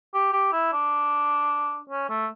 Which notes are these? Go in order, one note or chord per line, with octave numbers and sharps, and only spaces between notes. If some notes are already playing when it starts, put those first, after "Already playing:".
G4
G4
E4
D4
C#4
A3